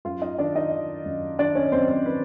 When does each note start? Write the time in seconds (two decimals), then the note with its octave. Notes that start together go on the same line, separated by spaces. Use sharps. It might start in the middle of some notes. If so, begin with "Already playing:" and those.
0.05 F#2 F4 F5
0.22 D#4 D#5
0.39 D#3 D4 D5
0.55 D#4 D#5
0.72 D#3
1.06 F#2
1.39 D#3 D4 D5
1.55 C#4 C#5
1.72 F#2 C4 C5
1.89 C4 C5
2.06 D#3 B4